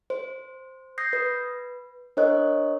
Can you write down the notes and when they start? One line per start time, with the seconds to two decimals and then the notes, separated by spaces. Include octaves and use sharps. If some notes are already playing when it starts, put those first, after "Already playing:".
0.10 C5
0.98 D#6 G6 G#6 A#6 C7
1.13 B4
2.17 D4 A#4 C5 C#5 D#5 F#6